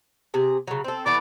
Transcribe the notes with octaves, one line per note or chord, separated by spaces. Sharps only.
C3 G#4
C#3 F#3
C4 A4
E3 A3 B3 D5